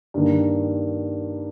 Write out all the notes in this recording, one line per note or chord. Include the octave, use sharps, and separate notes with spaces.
G2 D#3 A#3